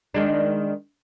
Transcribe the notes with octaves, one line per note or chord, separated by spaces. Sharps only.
D#3 G#3 D4